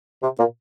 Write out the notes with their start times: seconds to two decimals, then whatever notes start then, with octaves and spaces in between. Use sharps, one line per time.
0.22 C3
0.38 A#2